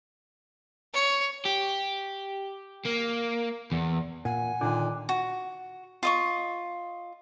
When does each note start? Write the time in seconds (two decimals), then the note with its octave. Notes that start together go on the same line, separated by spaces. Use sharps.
0.93 C#5
1.45 G4
2.86 A#3
3.72 E2
4.25 A#2 F#5 G#5
4.61 A#2 D3 D#3 D6 F#6
5.09 F#4
6.03 F4 D#5 C#6